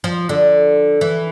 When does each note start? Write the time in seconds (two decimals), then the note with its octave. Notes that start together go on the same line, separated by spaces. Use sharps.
0.04 F3
0.29 D3
1.01 E3